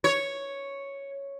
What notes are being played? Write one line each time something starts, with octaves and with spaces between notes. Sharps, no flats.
C#5